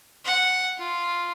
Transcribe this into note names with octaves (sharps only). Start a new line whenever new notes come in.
F#5
F4